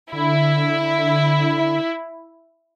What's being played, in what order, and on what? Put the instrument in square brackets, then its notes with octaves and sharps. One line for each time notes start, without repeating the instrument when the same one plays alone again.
[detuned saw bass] D3 [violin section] E4